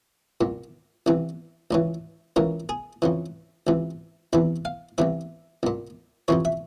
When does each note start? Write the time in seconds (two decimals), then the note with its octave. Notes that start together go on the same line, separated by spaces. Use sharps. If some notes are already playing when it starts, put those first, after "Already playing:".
0.41 C2 A#2
1.06 C2 C3 E3
1.71 C#2 C#3 E3
2.36 C#2 C#3 E3 A#4
2.69 G#4
3.02 F2 C#3 E3
3.67 C#2 C3 E3
4.33 E2 C3 E3 E5
4.65 F5
4.98 C2 C3 E3 E5
5.63 C2 A#2
6.28 F2 C3 E3 C#5
6.45 E5